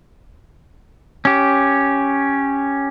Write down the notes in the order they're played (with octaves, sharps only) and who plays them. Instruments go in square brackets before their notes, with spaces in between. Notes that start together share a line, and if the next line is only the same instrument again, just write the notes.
[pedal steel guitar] C#4 G4